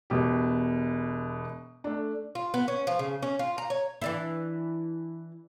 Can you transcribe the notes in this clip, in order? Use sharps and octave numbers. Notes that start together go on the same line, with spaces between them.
E1 B2 G4
A3 D4
F4
B3
C#4
F3
C#3
C#4
F4
A#5
C#5
E3 D4 E4